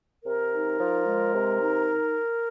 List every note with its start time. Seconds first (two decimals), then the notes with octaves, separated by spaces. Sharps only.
0.25 C3 A#4
0.51 D#4
0.79 F3
1.06 G#3
1.34 C3
1.61 D#4